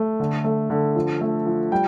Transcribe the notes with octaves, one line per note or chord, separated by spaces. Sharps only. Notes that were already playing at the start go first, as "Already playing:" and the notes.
Already playing: A3
D3
A3
D3
F3
A3
F3
G3 G5